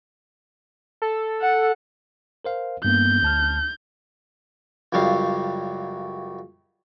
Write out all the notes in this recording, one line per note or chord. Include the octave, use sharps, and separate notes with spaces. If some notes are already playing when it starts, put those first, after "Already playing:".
A4
F#5
A#4 C5 F5
G2 A#3 B3 G6
D2 A5 F6
C#2 F#2 F#3 G3 F5